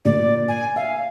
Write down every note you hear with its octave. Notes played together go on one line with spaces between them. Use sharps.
A#2 D5
G#5
E5 F5